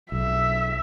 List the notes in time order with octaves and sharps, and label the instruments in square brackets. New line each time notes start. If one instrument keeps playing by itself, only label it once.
[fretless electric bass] B1 [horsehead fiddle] E5